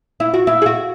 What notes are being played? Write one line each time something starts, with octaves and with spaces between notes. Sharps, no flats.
E4
F#4
E4
G#4
F#4